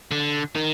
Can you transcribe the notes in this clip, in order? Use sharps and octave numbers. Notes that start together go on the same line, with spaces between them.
D3
D#3